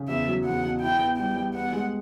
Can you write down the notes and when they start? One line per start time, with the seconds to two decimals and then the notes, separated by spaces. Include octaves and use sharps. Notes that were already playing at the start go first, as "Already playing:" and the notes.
Already playing: C#3
0.08 E2 E5
0.27 F#3
0.45 E2 F#5
0.63 B2
0.82 E4 G5
1.00 B3
1.18 G3 G5
1.36 G3
1.55 B3 F#5
1.73 G#3